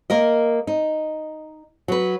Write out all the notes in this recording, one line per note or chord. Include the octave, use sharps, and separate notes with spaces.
A#3 A#4 D#5
D#4
F#3 B4